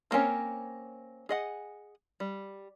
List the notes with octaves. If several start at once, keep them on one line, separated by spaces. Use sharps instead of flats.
F3 A#3 C4 C#4 C#5
G#4 D#5 F#5
G3